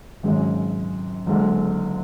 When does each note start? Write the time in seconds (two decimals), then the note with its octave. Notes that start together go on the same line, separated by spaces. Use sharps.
0.23 G#1 F#2 C#3 G#3
1.27 F#1 F#2 D3 G#3